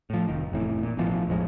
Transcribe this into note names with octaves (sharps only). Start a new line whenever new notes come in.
A2 F3
F1 D#3
F1 A2 E3
A#2
A1 B2 E3 F3
E1 A1 F3 G#3